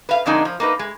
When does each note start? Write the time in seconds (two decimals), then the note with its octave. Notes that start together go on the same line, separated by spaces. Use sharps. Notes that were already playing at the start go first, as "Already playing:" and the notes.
0.09 B4 F5
0.26 F2 D3 G#3 D4 D#4 A#4
0.45 F3
0.60 A#3 D#4 B4
0.79 G#3